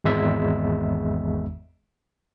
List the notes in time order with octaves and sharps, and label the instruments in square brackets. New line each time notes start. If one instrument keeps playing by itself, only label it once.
[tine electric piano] G#1 E2 G#3 E5